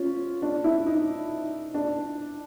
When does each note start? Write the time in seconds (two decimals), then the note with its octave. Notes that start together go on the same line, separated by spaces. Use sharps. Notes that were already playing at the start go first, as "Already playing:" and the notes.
Already playing: C#4 F4
0.42 D4
0.64 E4
0.86 D#4
1.74 D4